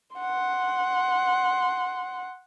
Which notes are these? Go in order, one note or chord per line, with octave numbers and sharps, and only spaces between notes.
F#5 C6